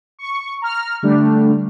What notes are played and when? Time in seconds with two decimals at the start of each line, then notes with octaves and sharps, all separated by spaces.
0.19 C#6
0.62 A#5 F6
1.03 D3 G3 A3 D4